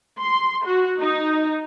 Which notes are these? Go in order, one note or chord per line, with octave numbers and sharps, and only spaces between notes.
C6
F#4
D#4